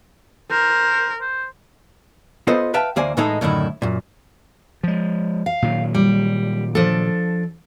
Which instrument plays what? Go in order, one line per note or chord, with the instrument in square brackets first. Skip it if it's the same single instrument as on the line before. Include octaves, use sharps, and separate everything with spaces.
[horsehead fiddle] A#4 [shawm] C5
[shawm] C5
[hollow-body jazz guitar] B3 F4 A4 B4 C5 D#5
B4 E5 F5 G5 A5
D2 E3 A#3 C5 D5 G#5
A2 E3 G#3 D#4 G#4 A4
F#2 A2 D3 D#3 E4
F#2 A#2
[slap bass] F3 G#3
[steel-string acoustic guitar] F5
[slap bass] A#2 D#3 F#3
[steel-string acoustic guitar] G3
F3 D4 A4